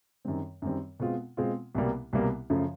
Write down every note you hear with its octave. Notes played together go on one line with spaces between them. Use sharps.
F#2 D#3 G3 C4
F#2 D#3 G3 C4
B2 G#3 C4 F4
B2 G#3 C4 F4
C2 B2 G3 A#3
C2 B2 G3 A#3
F#2 C#3 F3 A3